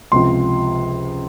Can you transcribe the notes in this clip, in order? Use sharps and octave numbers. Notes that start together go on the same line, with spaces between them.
C#2 C3 F3 C6